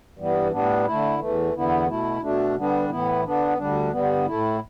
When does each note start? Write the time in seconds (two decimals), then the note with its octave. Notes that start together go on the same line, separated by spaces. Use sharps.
0.17 G2 E3 G3 B3
0.51 A2 G3 B3 D4
0.86 D3 A3 E4
1.19 E2 E3 A3
1.54 E2 D3 B3 E4
1.88 B2 A3 E4
2.22 B2 A3 D4
2.56 D3 G3 B3 D4
2.89 A2 E3 B3 E4
3.24 D3 B3 D4
3.58 D2 D3 G3 D4
3.92 G2 D3 G3 B3
4.26 A2 A3 E4